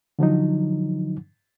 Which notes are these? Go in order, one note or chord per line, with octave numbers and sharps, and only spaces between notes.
D3 F3 F#3 D#4